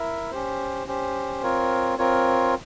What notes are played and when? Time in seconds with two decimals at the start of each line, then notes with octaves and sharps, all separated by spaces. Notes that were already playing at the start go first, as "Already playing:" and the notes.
Already playing: E4 A#4 E5
0.31 C#4 G4 C5
0.87 C#4 G4 C5
1.43 C4 F4 A#4 C#5
1.98 C4 F4 A#4 C#5